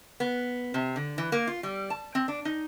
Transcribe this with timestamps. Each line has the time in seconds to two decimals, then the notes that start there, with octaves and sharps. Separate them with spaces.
0.20 B3
0.74 C3
0.96 D3
1.18 E3
1.32 A#3
1.47 F4
1.63 G3
1.90 A5
2.15 C4
2.28 D4
2.45 D#4